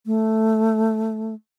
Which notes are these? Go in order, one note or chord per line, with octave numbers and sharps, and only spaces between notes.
A3